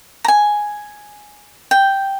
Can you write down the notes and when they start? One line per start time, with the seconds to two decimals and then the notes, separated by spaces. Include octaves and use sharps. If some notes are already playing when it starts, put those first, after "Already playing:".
0.24 A#5
0.28 G#5
1.71 G5